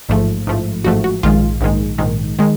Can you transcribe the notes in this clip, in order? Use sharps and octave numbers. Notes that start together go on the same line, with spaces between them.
A1 G#2 F3 A3
A1 G#2 F3 A3
A1 G#2 F3 A3 F#4
F#4
A#1 G#2 D#3 G#3 F4
A#1 G#2 D#3 G#3
A#1 G#2 D#3 G#3
D#3 G#3